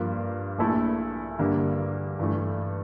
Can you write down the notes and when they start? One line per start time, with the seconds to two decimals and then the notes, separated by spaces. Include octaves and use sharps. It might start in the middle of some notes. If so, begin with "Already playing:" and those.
Already playing: G2 F3 A#3 F4
0.59 A#1 A#2 A3 E4 A4
1.39 G2 D3 G3 A#3
2.19 G2 E3 A3